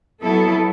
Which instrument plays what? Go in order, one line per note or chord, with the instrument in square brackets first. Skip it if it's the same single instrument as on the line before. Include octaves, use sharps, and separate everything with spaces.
[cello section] F#3 B3 E4 A4